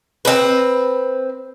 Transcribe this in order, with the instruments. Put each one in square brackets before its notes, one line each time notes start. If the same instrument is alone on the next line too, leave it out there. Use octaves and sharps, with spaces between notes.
[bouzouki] C4 B4